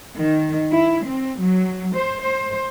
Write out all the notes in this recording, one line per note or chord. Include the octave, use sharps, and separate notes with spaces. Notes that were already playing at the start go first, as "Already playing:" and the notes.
D#3
E4
C4
F#3
C5
C5